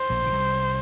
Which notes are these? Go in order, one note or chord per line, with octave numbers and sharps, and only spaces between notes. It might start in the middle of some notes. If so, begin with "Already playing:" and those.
Already playing: C5
A#1 A#2
C#3
C2 C3